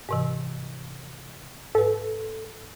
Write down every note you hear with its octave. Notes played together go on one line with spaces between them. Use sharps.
G#2 C3 E3
G#2 A4 B4